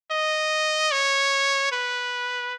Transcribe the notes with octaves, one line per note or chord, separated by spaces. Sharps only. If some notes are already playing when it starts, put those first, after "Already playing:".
D#5
C#5
B4